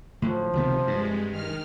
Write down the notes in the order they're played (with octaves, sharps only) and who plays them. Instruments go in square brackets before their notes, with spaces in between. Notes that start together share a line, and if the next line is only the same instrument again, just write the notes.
[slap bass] A2 D3 [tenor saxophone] F3
[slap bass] C#2 D#3 B3 [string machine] C3
[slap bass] G2 [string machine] G#3
[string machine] D#3 F6